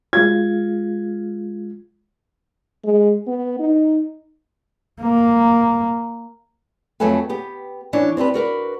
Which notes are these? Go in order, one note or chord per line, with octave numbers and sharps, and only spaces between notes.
G#3 F4 G#6
G#3
B3
D#4
A#3
F2 F#3 A3 A4 B4 G#5
B3 G4
E3 C#4 D4
C4 D4 G4 B4
F#4 A#4 B4 D5